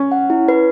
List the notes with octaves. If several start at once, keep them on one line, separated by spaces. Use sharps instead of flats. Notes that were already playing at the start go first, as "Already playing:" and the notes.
Already playing: C#4
F#5
E4
B4